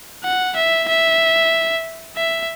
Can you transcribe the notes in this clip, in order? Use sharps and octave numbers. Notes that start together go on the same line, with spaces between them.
F#5
E5
E5
E5